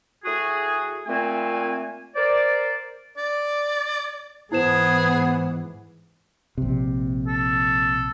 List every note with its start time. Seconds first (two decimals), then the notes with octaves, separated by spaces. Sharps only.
0.24 A2 F#4 G#4
1.06 A#2 A3 C4 G#5
2.15 A#4 C5 D5
3.17 D5
4.52 G#2 E3 B3 E4 G#4 C5 E7
6.58 A#1 C3
7.27 A4